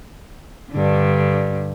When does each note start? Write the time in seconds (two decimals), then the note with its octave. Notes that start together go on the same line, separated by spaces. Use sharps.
0.71 G2 D3